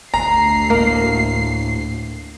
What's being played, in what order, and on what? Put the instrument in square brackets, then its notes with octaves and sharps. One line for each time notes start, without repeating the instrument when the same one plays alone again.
[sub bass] G1 [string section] D2 C7 [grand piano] A#5
[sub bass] A2 [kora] A#3